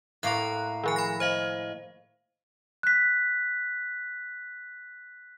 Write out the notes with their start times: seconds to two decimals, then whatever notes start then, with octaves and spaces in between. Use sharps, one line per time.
0.23 A2 A#3 C6 F#6
0.84 D#3 F3 G#5
0.96 B5 A#6
1.20 C5 D#5 F5
2.83 F#6 B6